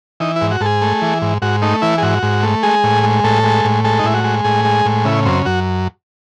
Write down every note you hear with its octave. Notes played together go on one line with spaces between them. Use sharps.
E3 D#4
E4
G#2
F#4
G#2 G#4 A4
A3
E3
G#2
G#2 F#4
A3 D#4
E3 E4
G#4
G#2 F#4
G#2
A3
G#3 G#4
A2
G#3
A2 A4
G#3
A2
G#3 A4
D#4
A2 E4
F#4
G#3
A2 G#4
G#3
A2
C#3 E4
F#2 C4
F#2 F#4